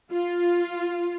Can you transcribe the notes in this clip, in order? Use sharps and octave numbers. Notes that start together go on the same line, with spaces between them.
F4